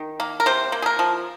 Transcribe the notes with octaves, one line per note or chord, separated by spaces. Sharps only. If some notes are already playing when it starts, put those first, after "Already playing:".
Already playing: D#3
A#3
A#4
C3 C5
A#3
G#4
A#4
F3